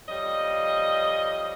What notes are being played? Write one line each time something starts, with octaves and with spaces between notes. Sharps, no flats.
F2 F3 G3 C#5 D#5